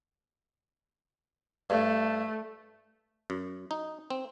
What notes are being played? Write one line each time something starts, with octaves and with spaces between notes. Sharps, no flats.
G2 A3
F#2
D#4
C4